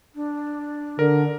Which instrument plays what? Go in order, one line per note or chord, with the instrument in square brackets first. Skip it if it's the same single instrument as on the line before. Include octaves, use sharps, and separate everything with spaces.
[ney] D4
[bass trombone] D3 [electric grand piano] A#4